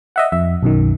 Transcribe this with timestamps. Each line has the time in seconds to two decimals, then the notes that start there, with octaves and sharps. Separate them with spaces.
0.16 D#5 E5 F#5
0.32 F2 E5
0.63 B1 F#2 D#3